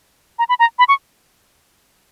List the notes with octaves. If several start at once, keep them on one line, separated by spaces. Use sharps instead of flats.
A#5
B5
A#5
B5
C#6